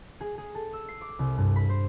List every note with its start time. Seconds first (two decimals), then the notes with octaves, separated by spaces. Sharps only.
0.21 G#4
0.38 G#4
0.55 A4
0.73 E6
0.88 C7
1.01 D6
1.19 C2
1.38 G2
1.56 B5
1.69 C5